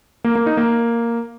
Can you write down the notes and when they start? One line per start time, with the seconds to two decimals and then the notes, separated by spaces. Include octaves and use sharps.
0.24 A#3
0.35 A#3
0.46 D#4
0.57 A#3